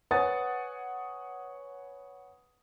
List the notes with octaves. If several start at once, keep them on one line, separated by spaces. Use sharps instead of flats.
B4 C#5 F#5 G#5 D#6 A6